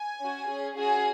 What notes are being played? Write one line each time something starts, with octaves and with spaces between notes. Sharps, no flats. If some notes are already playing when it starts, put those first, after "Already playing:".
Already playing: G#5
C#4 F#4
C#4 G#4
C#4 F#4 G#4 G#5